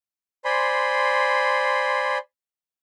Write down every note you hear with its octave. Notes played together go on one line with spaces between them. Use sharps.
C5 D5 G#5 B5 C6